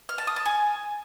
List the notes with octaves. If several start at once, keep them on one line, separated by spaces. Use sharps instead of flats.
F6
A5
D#6
A5
G#5